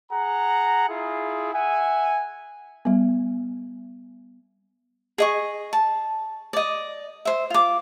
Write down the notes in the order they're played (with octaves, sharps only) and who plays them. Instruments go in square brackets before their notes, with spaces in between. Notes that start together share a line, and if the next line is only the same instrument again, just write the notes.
[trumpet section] G#4 F#5 A#5
E4 F4 G#4
E5 F#5 G#5
[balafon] G3 B3
[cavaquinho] G#4 D#5 C#6
A5
D5 D#5
C5 E5
F4 D6